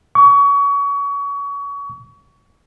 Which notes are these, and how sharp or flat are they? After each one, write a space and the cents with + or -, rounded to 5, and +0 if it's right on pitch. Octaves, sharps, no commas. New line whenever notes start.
C#6 +30